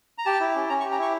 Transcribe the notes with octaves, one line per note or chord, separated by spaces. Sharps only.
A#5
G4 A5
E4
C#4
C#4 A#5
C#6
G4
A#5
E4 C#6